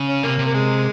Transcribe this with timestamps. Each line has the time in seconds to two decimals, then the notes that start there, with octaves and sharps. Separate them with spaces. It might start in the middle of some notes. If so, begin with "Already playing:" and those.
Already playing: C#3
0.09 C#4
0.23 C3 A#3
0.39 C3
0.47 A#3
0.54 G#3